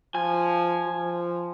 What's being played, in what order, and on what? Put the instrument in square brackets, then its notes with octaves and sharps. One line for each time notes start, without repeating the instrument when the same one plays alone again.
[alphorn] F3 [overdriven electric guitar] G#5
[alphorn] F3